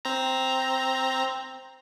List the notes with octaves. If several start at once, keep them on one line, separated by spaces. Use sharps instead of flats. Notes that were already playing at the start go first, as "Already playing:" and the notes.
C4 A#5